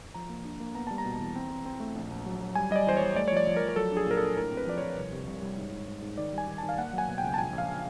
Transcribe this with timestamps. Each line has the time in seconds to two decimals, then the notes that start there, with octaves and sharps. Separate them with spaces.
0.14 F3 A#5
0.29 A#3
0.45 D4
0.60 A#3
0.75 B3 A#5
0.87 G3 A5
0.98 A#5
1.05 B2
1.20 E2
1.36 C4
1.51 C4
1.66 C4
1.80 A3
1.95 A#1
2.10 A#1
2.26 F#3
2.41 F#3
2.55 G3 G#5
2.71 G3 D#5
2.76 D5
2.87 E2 C5
2.97 G3 C#5
3.16 A3 D5
3.28 C#5
3.32 F3 D5
3.47 F3
3.56 A#4
3.62 F3
3.69 A#4
3.76 F#3 A4
3.92 D4 G#4
4.06 A#2 A#4
4.17 D4 A4
4.36 A2 A#4
4.51 C4
4.57 B4
4.67 F3 D5
4.78 F3 C#5
4.98 C2
5.12 C3
5.27 C2
5.42 G3
5.58 G#2
5.72 G#2
5.88 G#2
6.02 G#2
6.18 D#3 D5
6.33 G3
6.38 G#5
6.48 D#3
6.58 D#3 A5
6.69 F5
6.78 A#3 F#5
6.93 F#3
6.98 G#5
7.08 B2
7.18 C#2 G5
7.34 A5
7.38 A#1 G#5
7.53 A#1
7.58 F5